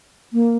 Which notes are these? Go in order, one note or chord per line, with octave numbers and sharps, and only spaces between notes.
A#3